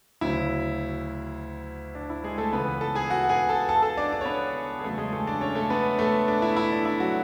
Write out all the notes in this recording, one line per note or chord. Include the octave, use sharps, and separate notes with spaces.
D2 C#3 F#3 E4
D4
E4
G#3 G#4
A3 A4
C#2 C#3 E3 B3 B4
A4 A5
G#4 G#5
F#4 F#5
G#4 G#5
A4 A5
A4 A5
A4 A5
D4 D5
D4 D5
C#5
B3 B4
G#4
E2 C#3 F#3 A3 A4
G#3 G#4
A3 A4
D4 D5
C#4 C#5
A3 A4
B3 B4
A3 A4
D4
E4
E4
D4
E4
F#3 F#4